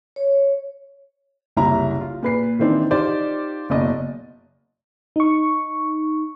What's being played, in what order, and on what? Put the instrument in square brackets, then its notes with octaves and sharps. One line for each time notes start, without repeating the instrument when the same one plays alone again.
[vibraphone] C#5
[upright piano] F#1 C2 E4 A#5
F4
A#2 B4 C7
D#3 E3 C4 D4 D#4
D#4 F4 G4 C5 D5
F#1 B2 D5 D#5
[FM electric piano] D#4 C#6